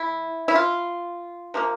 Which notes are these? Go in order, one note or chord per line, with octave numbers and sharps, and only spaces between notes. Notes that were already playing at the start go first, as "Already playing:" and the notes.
Already playing: E3 E4
E4
F4
C3 F3 A#3